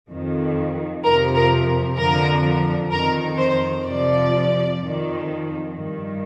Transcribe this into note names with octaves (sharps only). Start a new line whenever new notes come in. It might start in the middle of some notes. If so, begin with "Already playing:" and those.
F2 D#3
F2 C3 F3 A#4
A#4
F2 D3 F3 A#4
F2 D#3 A#4
C5
F2 C3 F3 D5
F2 D#3
G2 D#3